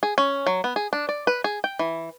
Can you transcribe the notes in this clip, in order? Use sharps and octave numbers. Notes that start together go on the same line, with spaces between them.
G#4
C#4
F#3
B3
G#4
D4
D5
B4
G#4
G5
E3